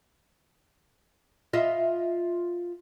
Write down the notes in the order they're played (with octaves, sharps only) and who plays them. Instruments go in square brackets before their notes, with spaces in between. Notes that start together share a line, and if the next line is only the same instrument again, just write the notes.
[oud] F4 D#5 E5